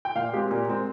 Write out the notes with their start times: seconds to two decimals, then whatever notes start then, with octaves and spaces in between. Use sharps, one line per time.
0.05 G5
0.15 A#2 F5
0.33 G#3 C4 G4
0.51 A#2
0.68 G#3 C4